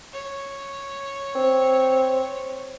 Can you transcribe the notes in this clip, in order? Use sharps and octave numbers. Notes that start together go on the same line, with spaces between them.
C#5
C4